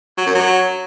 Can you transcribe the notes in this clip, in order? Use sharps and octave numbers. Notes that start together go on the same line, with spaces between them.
F#3
F#2
F#3